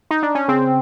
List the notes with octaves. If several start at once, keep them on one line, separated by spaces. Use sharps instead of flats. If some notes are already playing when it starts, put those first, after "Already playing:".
D#4
D4
C#4
C#3 C4